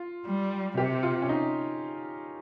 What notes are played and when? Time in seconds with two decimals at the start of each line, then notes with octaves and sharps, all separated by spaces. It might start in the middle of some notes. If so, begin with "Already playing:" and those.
Already playing: F4
0.26 G3
0.78 C3 G4
1.03 F4
1.22 C#4
1.29 D#4